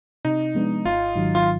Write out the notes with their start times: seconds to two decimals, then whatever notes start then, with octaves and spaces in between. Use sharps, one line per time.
0.25 C3 D#4
0.55 F3 G#3 B3 D4
0.85 G#1 F4
1.16 G#2 D#3 F#3
1.35 F4